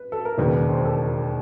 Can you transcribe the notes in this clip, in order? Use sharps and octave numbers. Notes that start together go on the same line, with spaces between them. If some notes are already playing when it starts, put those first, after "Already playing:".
Already playing: B4
A4
A#4
E1 D#2 C#3 B4
C5
A4